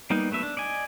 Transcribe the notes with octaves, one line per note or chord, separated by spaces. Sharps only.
G3 A#3 B3 D#4
F#3 A3 B3 E5
D4
D5 D#5 G#5